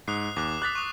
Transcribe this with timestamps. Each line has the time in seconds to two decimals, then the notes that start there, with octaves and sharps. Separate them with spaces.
0.08 G#2 D#6 F#6 C7
0.36 D#2 D6 F#6
0.62 D6 D#6 F#6 A6 B6
0.75 C#6 D#6